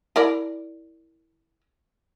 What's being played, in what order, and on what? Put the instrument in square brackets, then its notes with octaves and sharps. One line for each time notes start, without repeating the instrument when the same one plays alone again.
[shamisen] E4 A#4 D5